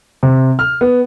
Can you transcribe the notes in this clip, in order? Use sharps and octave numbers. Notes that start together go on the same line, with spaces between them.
C3
F6
B3